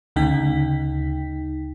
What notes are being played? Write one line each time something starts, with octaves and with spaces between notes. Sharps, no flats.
D2 C#3 D#4 G5 B6